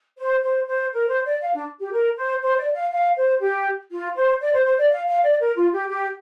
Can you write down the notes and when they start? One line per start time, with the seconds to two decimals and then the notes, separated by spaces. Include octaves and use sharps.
0.18 C5
0.43 C5
0.67 C5
0.93 A#4
1.09 C5
1.25 D5
1.42 F5
1.54 D4
1.80 G4
1.91 A#4
2.16 C5
2.42 C5
2.58 D5
2.74 F5
2.91 F5
3.17 C5
3.40 G4
3.91 F4
4.16 C5
4.41 D5
4.53 C5
4.64 C5
4.77 D5
4.90 F5
5.06 F5
5.23 D5
5.40 A#4
5.56 F4
5.73 G4
5.89 G4